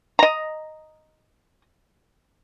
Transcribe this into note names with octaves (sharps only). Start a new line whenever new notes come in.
D#5 A#5